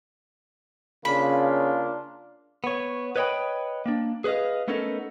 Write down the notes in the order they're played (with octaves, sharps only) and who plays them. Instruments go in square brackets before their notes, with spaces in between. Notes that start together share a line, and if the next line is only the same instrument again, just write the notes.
[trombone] C#3 [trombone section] A#3 D4 F4 [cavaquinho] B5
[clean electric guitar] B3 C#5
B4 C#5 D#5 E5 G5 B5
A#3 D4
G#4 B4 C5 D#5 F5
A3 B3 C#4 D#4 A4 A#4